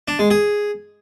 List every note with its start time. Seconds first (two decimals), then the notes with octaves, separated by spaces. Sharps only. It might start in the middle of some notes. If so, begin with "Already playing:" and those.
0.08 D4
0.19 G#3
0.30 G#4